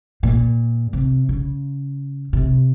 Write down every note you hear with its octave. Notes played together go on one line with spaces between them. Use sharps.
A#2
C3
C#3
C3